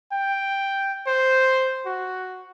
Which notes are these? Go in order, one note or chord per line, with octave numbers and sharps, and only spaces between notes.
G5
C5
F#4